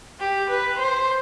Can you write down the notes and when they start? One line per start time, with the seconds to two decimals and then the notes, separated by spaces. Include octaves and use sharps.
0.20 G4
0.50 B4
0.79 C5